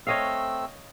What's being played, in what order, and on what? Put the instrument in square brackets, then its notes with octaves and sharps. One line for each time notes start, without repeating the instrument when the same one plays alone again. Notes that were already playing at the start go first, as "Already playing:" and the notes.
[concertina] A3 C4 E6 [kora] C#5 D#5 F5